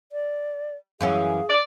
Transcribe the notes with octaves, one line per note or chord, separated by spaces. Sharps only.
D5
F#2 E3 C#4 G#4 F5
D5